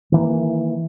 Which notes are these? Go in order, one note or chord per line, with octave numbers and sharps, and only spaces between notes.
D#3 E3 A#3